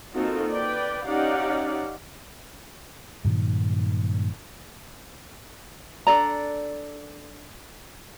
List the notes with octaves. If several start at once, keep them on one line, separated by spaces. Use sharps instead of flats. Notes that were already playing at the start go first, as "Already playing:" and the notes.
A#3 C4 D#4 F4 F#4 A4
B4 D5 G5
C#4 D#4 G4 D5 F5 F#5
G2 A#2 D#3 F#3
D4 A4 D5 A#5